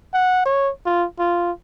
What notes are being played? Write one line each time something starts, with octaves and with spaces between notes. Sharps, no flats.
F#5
C#5
F4
F4